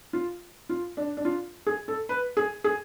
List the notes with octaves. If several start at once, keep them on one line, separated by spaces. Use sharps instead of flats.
F4
F4
D4
D4
F4
G#4
A4
B4
G#4
G#4